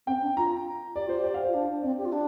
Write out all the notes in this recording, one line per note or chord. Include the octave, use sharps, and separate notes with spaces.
C4 G5
D4
F4 A#5
G4 D5
F4 C5
G4
D5
F5
F4 C5
D4
C4 D5
G4
F4
D4